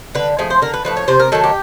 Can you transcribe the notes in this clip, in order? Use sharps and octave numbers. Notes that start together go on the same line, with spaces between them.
D3 B4
F3 A3 G#4
C5
D3 A#4
B4
F3 A3 B4
C#5
C3 C5
A#4
D#3 F#3 A3 A4
G4